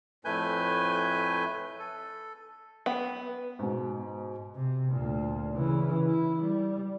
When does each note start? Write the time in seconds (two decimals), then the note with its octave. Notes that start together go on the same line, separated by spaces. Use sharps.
0.25 F2 A2 A3 B4 G#5 G6
1.79 A4
2.86 B3
3.59 G#2 B2
4.56 C3
4.92 D2 A#2
5.53 C#3 E3
6.06 E4
6.43 G3